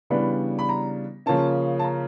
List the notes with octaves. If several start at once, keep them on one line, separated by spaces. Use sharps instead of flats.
C#3 E3 G3 B3 D4 B5
B5
A#5
C#3 F3 A#3 C#4 A5
A5
A#5